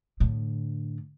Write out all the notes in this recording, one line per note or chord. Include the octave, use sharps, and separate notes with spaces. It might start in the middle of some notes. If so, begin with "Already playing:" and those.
A2 D3